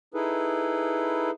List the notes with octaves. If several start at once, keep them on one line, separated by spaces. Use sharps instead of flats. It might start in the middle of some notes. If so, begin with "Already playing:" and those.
D#4 E4 G#4 A4 B4